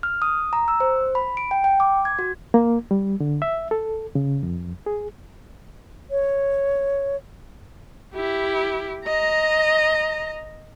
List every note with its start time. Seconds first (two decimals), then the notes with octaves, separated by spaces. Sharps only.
0.03 F6
0.22 D#6
0.53 A#5
0.68 E6
0.80 C5
1.15 B5
1.37 D7
1.51 G5
1.64 G5
1.80 D6
2.05 G#6
2.19 F#4
2.54 A#3
2.91 G3
3.20 D3
3.42 E5
3.71 A4
4.15 C#3
4.43 F2
4.86 G#4
6.11 C#5
8.15 E4 G4
9.07 D#5 A#5